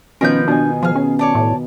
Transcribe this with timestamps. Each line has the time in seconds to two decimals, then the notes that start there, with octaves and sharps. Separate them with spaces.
0.21 B2 D#3 F3 C#4 A#4 B4 G6
0.48 B2 D4 G#5
0.83 F3 G#4 F6
0.95 C#4
1.19 C#5 D5 A5
1.35 A2